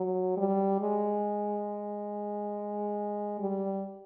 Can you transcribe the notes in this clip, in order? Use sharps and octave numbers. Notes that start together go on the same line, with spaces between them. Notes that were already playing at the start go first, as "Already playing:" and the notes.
Already playing: F#3
G3
G#3
G3